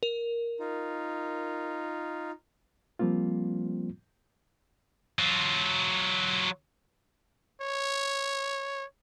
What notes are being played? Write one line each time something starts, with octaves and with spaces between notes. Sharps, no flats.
A#4
D#4 F4
F3 G3 A#3 C4 F4
F#3 F4
C#5